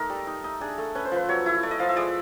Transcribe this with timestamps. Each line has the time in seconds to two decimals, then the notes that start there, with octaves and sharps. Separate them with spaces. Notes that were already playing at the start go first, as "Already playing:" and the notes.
Already playing: A3 D#4 A#4
0.10 G3
0.27 D#4
0.44 D#4
0.61 D4 G#4
0.78 A3 A4
0.95 C#4 B4
1.05 C5
1.12 F3 B4
1.29 F#3 C#5
1.46 E4
1.63 A3 D5
1.71 D#5
1.79 F3 F5
1.89 E5
1.96 G#3 D5